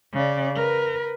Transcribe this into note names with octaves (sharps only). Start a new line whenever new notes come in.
C#3 D5
A#4 B4